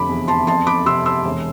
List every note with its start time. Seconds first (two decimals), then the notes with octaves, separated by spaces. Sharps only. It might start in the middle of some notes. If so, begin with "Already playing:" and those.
Already playing: F1 D3 B5 D6
0.09 E2
0.28 A5 C6
0.47 F2 A5 C6
0.67 B5 D6
0.86 C3 C6 E6
1.05 C6 E6
1.25 E1